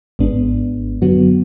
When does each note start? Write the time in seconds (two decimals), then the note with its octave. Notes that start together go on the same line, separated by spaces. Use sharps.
0.19 G#1 G#2 G#3 B3 D4
1.01 F#2 D3 F#3 B3 F#4